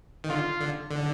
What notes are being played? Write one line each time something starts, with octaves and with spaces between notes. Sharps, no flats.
D#3
D3 F4
D3
D3